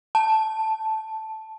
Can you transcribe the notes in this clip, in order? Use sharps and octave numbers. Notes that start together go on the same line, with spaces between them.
A5